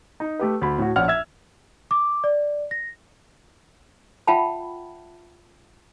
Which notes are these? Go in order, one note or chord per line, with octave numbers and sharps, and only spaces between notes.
D#4
A3 G4 B4
D2 B5
A2 F#4
A#1 C#4 D5 F#5 F6
E5 E6 G#6
D6
D5
A#6
F4 E5 F#5 G5 A5 B5